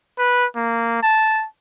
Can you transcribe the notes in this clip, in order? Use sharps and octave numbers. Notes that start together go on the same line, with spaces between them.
B4
A#3
A5